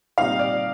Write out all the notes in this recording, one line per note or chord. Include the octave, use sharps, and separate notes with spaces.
A#2 G3 C4 D#4 F5
D5